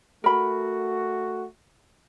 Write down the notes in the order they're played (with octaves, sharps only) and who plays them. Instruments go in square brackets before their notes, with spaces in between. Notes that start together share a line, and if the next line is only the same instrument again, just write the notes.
[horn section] A3 F#4 [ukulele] A#4 B5